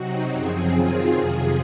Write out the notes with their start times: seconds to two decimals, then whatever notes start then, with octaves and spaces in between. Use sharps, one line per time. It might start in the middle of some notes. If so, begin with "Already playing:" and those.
Already playing: C3 F#3 C4 D#4 F#4
0.32 F#2 C#3 F3 C4 G#4
0.73 D#3 F#3 C4 F4
1.12 F2 C3 F3 G#4